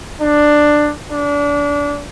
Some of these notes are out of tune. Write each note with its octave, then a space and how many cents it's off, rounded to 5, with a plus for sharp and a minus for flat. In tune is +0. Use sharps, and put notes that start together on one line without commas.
D4 +10
D4 -25